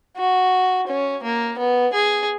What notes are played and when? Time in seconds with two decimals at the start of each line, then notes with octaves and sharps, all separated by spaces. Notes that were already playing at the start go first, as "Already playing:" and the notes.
0.17 F#4
0.87 C#4
1.23 A#3
1.58 B3
1.93 G#4